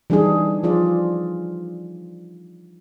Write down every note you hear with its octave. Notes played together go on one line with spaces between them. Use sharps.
E3 G3 D4 D#4 G#4
F3 F4 G#4 D5